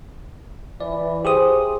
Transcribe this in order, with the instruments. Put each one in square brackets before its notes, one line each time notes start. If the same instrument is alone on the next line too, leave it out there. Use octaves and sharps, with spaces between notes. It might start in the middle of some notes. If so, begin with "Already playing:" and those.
[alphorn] E3 [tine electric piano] D5
[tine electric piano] G4 G#4 D#6 [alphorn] C5